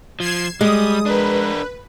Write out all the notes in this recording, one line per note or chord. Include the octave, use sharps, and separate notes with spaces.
F3 G#6 C7 E7
G3 G#3 D#6
D4 A#4 B4